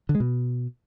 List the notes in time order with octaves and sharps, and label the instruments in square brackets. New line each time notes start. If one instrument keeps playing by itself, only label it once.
[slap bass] D3
G#3
B2